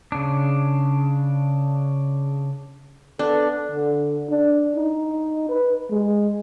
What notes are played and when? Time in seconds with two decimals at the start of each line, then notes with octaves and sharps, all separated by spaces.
0.12 C#3 D4
3.19 B3 D4 A4
3.71 D3
4.30 D4
4.76 D#4
5.49 B4
5.90 G#3